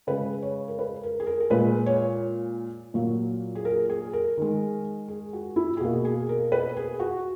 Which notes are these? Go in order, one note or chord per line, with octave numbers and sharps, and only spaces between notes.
C#3 G#3 B4
C#5
A#4
B4
A#4
G#4
A#4
A#4
A#2 G#3 B4
C#5
A#2 F#3 A#3
G#4
A#4
G#4
A#4
D#3 G#3
G#4
F#4
E4
G#4
B2 A#3 F#4
G#4
A#4
B4
G#4
F#4